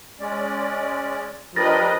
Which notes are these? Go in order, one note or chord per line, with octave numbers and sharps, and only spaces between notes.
G#3 C#4 D5
F3 D4 G4 A#4 B4 D#5 A6 A#6